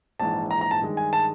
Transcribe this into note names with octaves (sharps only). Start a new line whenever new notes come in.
A#1 G#2 E3 A5
A#5
A#5
A5
G2 D#3 G#3
G#5
A5